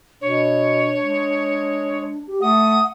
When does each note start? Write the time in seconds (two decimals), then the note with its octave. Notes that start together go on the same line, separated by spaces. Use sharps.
0.21 B2 D4 C#5
1.00 G#3
2.27 G4
2.42 A3 F#5 D#6